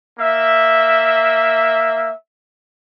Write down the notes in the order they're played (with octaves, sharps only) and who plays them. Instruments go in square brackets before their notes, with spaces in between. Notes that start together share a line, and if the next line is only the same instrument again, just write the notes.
[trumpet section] A#3 E5